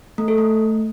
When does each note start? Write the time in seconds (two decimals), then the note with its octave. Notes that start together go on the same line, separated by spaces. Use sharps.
0.18 A3
0.28 A4
0.38 A3